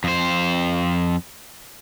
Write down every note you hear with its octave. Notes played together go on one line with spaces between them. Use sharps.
F2 C5